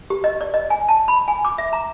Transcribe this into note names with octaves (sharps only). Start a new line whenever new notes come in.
G4
D#5
D5
D#5
G#5
A5
B5
G#5
D6
E5
A#5